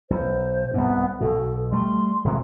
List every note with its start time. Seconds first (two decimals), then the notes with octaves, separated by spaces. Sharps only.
0.10 B1 C5
0.74 C2 G#2 B3
1.21 B1 B2 A4
1.72 G3 A3 C6
2.24 D#1 C3 G#3